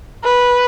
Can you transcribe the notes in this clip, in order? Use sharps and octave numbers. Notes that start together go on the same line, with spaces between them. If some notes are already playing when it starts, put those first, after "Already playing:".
B4